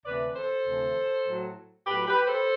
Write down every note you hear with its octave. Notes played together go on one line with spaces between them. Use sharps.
D2 C3 E3 B4 D5
A4 C5
D2 C3 E3
A2 F#3
A2 F#3 G4 B4
G4 B4
A4 C5